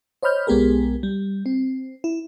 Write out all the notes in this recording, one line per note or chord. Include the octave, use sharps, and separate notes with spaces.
C5 C#5 D#5 B5 F6 G6
B1 G#3 B3 G4 G#4 A#4
G3
C4
E4